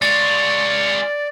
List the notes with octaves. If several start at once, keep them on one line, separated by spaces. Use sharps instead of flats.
G#3 F4 C#5 D5 A6